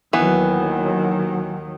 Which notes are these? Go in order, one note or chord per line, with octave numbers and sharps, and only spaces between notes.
D#2 D#3 E3 F#3 B3